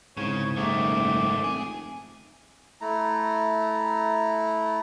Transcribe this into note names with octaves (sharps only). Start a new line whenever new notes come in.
C2 G#2 C#3 C#5
F#1 G#2 D#3 A3 D6
F1 G#4
A3 E4 A#5